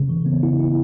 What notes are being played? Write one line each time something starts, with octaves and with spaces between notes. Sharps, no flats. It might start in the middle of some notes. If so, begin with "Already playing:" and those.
Already playing: C#3
E3
B3
E4
E4